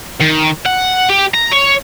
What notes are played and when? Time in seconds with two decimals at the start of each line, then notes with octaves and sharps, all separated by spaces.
0.21 D#3
0.66 F#5
1.09 G4
1.34 A#5
1.52 C#5